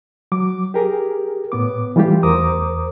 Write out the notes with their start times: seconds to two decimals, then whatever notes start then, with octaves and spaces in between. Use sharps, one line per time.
0.32 F#3 D6
0.74 G4 G#4 A#4
1.52 A2 B3 D6
1.96 E3 G3 A3 F4 G4
2.23 E2 A#4 C5 A#5 D6 D#6